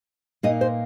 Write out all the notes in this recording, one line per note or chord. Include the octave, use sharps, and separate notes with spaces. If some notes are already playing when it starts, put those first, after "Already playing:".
A#2 A#3 D#4 D#5
C5